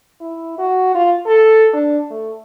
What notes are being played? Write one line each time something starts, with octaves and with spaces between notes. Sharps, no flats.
E4
F#4
F4
A4
D4
A3